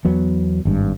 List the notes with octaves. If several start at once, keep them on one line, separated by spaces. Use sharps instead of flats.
E2 F#3 B3
G#1 G2